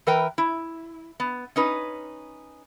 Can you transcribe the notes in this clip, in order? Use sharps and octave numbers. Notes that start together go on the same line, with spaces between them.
E3 A#4 B4 G5 A#5
E4
B3
C#4 D#4 B4